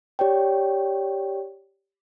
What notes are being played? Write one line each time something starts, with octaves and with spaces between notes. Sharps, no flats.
G4 C#5 D5 G5